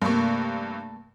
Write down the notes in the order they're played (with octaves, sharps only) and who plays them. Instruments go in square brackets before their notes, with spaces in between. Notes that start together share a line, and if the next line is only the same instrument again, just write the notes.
[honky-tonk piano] G2 C3 C#6 [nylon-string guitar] A3 A#3